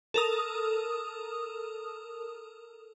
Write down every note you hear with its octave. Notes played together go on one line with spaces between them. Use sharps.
A4 A#4 D#6